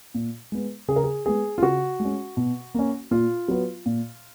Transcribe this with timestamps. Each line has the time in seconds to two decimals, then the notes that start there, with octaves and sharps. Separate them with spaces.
0.14 A#2
0.52 G#3 B3
0.88 C#3 G#4
0.96 A#4
1.04 G#4
1.26 G#3 B3 G#4
1.58 F4
1.63 C#3 F#4
2.00 G#3
2.05 C#4
2.37 B2
2.74 A#3 C#4
3.11 A#2 F4
3.48 F#3 B3
3.86 A#2